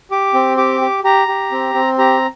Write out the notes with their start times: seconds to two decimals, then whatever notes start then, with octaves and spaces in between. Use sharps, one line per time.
0.11 G4 D6
0.34 C4
0.57 G4 D6
0.81 G4
1.04 G4 A#5
1.28 G4
1.52 C4
1.74 C4
1.98 G4 A#5